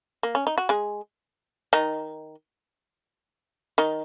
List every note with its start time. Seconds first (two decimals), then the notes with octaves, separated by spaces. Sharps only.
0.23 A#3
0.35 C#4
0.47 D#4
0.58 F#4
0.69 G#3 G#4
1.73 D#3 D#4
3.78 D#3 D#4